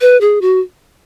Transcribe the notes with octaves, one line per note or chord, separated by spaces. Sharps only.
B4
G#4
F#4